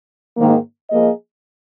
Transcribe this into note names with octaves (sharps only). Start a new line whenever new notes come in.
G#2 D#3 A#3
F3 A#3 G#4 D#5